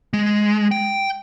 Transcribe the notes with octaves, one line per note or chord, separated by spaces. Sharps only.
G#3
G5